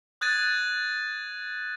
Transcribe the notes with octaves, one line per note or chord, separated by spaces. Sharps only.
D#6 F#6 G#6 A6 D#7